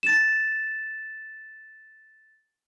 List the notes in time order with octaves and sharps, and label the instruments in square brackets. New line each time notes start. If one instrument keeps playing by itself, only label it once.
[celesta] A6 E7